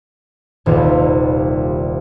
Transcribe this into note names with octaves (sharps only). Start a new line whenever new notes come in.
D#1 C2 F4